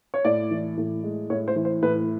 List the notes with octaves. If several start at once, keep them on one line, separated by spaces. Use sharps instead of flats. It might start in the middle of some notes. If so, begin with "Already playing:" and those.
C#5
A2 D5
E3
A2
G#3
A2 C#5
C5
E3
C5
A2 B4